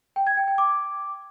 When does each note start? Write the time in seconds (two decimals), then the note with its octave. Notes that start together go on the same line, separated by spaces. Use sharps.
0.16 G5
0.27 G#6
0.37 G5
0.48 G5
0.58 D6